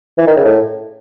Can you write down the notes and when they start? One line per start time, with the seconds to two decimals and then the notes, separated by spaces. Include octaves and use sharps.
0.18 E3
0.27 D#3
0.36 C#3
0.45 A2